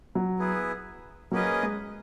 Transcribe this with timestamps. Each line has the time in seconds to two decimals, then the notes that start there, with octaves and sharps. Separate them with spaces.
0.15 F#3
0.39 B3 E4 G#4
1.31 F#3 A#3 C#4 G#4 B4 D#5
1.63 G#3